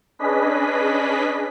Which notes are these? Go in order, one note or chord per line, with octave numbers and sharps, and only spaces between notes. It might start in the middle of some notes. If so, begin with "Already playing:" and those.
C#4 D4 G#4 B4 D#5 B6